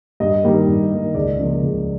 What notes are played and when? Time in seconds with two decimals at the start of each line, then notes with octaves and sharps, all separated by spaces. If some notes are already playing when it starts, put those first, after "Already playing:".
0.20 G2 D#5
0.43 D#3 G3 A#3
0.67 G2
0.91 D#3 G3 A#3
1.14 C#2 D5
1.39 C#3 F3 A#3
1.62 C#2